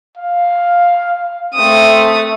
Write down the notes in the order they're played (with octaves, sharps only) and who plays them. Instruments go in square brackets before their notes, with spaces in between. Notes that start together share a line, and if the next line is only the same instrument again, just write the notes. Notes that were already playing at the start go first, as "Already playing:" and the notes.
[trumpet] F5
[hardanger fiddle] A3 D#6 [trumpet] C4